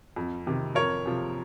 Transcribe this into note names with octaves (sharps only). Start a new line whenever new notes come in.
F2
C3 D#3
F2 A#4 C#5
C3 F3